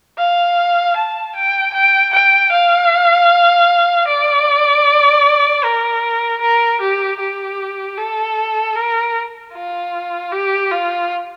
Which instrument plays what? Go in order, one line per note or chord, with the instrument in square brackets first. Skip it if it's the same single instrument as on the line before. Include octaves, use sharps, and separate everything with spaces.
[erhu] F5
A5
G5
G5
G5
F5
D5
A#4
A#4
G4
G4
A4
A#4
F4
G4
F4